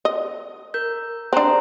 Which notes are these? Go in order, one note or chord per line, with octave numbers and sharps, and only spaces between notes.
D#5
A#4 G6
C4 D4 C5 A#5 C6